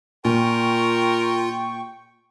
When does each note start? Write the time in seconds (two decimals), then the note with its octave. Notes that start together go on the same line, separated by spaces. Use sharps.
0.25 A#2 F4 A#4 G5 C#6